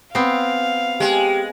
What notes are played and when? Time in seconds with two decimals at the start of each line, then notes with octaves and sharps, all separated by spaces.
0.15 B3 C4 F5
1.00 G#3 G4